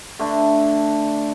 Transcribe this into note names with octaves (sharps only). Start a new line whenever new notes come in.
D3 A3 D4